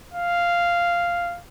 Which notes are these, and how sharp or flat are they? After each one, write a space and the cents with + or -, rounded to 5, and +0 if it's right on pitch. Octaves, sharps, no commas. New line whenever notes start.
F5 -5